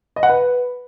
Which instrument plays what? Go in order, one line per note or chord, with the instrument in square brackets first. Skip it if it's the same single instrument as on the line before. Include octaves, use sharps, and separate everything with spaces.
[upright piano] D#5
F#5
B4